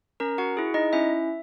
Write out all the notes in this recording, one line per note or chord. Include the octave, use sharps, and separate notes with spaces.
C#4 A#4 A#5
F#4 F#5
E4 G#4
D#4 D#5
C#4 E4 E5